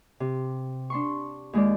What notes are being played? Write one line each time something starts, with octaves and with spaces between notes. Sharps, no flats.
C3
D4 C6 C#6
D#2 G#3 F4 D5